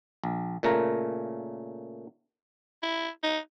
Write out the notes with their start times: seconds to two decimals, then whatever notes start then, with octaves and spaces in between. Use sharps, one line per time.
0.24 A#1
0.63 A#2 C#3 A3 A#4 A#5
2.83 E4
3.23 D#4